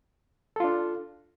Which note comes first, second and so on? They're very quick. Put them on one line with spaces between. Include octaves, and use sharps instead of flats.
A4 F4 D4